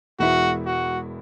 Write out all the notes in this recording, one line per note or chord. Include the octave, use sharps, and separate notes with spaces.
E1 E2 E3 G#3 E4 F#4
F#4